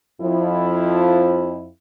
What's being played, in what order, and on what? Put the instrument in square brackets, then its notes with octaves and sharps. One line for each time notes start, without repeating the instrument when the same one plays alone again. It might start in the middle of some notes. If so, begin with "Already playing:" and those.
[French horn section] F2 F3 E4